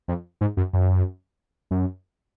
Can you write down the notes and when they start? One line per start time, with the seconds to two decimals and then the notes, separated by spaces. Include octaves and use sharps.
0.08 F2
0.41 G#2
0.57 F#2
0.73 F#2
1.71 F#2